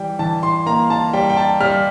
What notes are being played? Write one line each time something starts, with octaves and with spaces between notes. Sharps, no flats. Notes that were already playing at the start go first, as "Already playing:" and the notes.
Already playing: E3 G3 G5
E3 A5
C6
A#3 A#5
A5
G3 G5
G5
A5
G3 F6